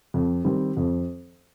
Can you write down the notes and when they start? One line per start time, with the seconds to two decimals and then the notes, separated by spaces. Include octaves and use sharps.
0.14 F2
0.45 D#3 G3 C4
0.77 F2